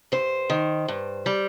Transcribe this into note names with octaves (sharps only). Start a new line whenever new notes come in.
G2 C5
D#3
G2
G3